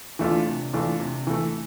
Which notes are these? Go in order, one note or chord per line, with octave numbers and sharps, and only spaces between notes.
E3 A3 D4 F4
C3
E3 A3 D4 F4
C3
E3 A3